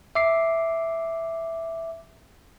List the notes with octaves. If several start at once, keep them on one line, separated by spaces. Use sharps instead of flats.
E5 D6 C7